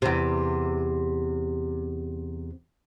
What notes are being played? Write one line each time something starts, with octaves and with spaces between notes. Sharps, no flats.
E2 C3